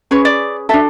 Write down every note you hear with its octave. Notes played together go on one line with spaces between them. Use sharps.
C#4 G#4 B4 C#5
D5
D4 F#4 A4 E5